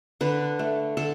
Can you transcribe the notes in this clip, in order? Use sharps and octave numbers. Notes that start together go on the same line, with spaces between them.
D3 B4
A3
D3 A4